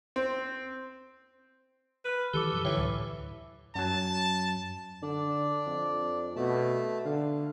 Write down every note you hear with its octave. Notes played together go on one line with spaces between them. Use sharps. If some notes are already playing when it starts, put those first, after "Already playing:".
C4
B4 B5 F6 D#7
D#3 E3 G3 G4 A4 D6 C#7 G7
F#2 C3 F3
D3 E3 F#3 C#5 G5
D2 A2
F#2 F#3 A5
D3 D4 D5
F2
B2 A3 A5
D3 F5